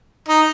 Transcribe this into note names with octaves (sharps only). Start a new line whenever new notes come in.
D#4